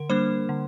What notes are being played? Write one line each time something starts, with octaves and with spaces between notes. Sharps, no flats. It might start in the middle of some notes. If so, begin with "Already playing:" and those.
Already playing: D3 A#4
G3 A#3 D4 C5
D3